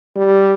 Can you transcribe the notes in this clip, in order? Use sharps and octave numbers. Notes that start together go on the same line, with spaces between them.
G3